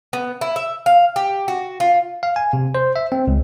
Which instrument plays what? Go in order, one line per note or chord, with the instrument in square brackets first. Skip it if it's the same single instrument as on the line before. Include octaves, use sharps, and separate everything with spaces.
[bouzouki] B3
E4
E5
F5
G4
F#4
F4
[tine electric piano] F5
G#5
C3
C5
E5
C4
C#2